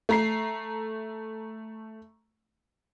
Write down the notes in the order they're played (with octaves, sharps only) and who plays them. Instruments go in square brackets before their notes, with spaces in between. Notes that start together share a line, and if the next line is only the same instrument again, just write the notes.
[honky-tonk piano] A3 A#5 C7